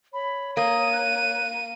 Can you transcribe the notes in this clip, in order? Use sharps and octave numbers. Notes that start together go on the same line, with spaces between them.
C#5 B5
A#3 D#6 D#7
F#6